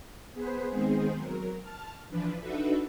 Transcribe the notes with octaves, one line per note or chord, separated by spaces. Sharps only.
B3 G#4 B4 C5
D#3 G#3 B3 C4 G#4 C5
F#3 A#4
A5 F6
E3 F3 D4 B4
D4 D#4 F#4 A4 B4 E5